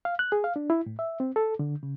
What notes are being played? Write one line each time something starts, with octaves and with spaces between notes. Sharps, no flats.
F5
F#6
G#4
F5
D4
E4
A2
E5
C4
A4
D3
C#3